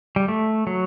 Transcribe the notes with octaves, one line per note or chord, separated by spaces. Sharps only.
G3
A3
F#3